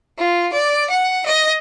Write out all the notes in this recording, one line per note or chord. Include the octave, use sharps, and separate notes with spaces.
F4
D5
F#5
D#5